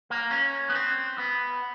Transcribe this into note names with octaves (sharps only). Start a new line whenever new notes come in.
A#3
C#4
B3
C4
B3